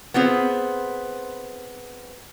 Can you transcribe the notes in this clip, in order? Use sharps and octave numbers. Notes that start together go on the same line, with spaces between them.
B3 C4 F4 G#4 C5